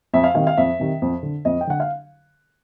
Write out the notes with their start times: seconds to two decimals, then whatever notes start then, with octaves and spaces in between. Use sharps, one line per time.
0.13 F2 E5
0.24 F5
0.35 C3 D#3 F5
0.47 F5
0.57 F2 E5
0.80 C3 D#3
1.02 F2
1.23 D3
1.45 F2 D#5
1.61 G5
1.67 D3 F#5
1.80 F5